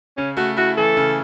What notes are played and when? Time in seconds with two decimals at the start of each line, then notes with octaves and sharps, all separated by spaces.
0.17 C#3 C#4
0.37 A3 F#4
0.57 E4 F#4
0.77 E3 A4
0.97 C#3